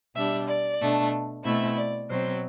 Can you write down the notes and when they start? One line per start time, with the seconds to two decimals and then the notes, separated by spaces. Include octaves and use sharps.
0.14 B2 G3 D4 E5
0.47 D5
0.80 B2 A3 D4
1.44 B2 A3 C4 E4 E5
1.77 D5
2.09 B2 F#3 C4 C5